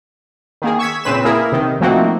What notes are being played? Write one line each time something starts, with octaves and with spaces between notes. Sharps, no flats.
D#3 A#3 G#4
C#6 E6 G#6 B6
A#2 C#3 C4 B4 B6 E7
A#3 E4 G#4 A#4
C3 D#3
F3 A3 A#3 C4 D#4 F#4